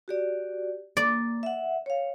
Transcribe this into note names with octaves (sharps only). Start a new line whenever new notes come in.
F#4 G4 D5
A#3 D5
E5 F#5
C#5 F5